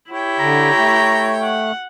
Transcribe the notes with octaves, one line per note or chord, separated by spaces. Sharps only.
E4 G4 C#5 G5
D3 A#5
A3
F#5